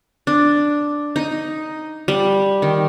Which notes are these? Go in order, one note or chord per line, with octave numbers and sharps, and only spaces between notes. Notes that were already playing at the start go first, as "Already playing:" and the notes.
D4
D#4
G3
D#3